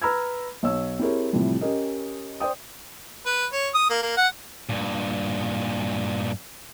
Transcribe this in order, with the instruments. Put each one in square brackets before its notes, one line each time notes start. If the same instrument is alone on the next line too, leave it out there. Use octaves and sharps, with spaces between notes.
[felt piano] B4 A#5 B5 E6 F6 G#6
B1 C#5 E6
C4 E4 G4 G#4 A#4 C#5
A2 C3 E3 F3 G3
C#4 G4 A#4 D#5
C5 D5 G5 D#6
[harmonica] B4
C#5
D#6
A#3
A#3
F#5
[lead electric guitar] G2 A#2